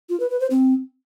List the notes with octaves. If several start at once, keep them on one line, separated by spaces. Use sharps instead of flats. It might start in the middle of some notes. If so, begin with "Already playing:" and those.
F4
B4
B4
C5
C4